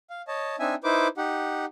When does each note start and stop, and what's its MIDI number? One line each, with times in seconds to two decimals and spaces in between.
0.10 0.22 77
0.28 0.56 73
0.28 0.56 75
0.28 0.56 81
0.60 0.75 60
0.60 0.75 62
0.60 0.75 63
0.60 0.75 76
0.60 0.75 80
0.84 1.08 63
0.84 1.08 64
0.84 1.08 71
0.84 1.08 72
0.84 1.08 86
1.17 1.65 63
1.17 1.65 67
1.17 1.65 78